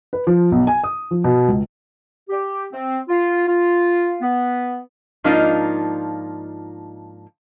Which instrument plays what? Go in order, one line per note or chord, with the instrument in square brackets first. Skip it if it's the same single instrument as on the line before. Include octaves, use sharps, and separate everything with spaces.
[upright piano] B4
F3
B1
G#5
D#6
F3
B2
C#2
[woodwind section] G4
C4
F4
F4
B3
[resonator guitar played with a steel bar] G#2 F3 A#3 D4 D#4 F4